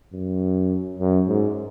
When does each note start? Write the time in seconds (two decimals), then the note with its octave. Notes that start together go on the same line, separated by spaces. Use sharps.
0.13 F#2
0.99 F#2
1.28 G#2